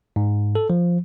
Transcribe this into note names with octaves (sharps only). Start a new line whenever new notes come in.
G#2
A4
F3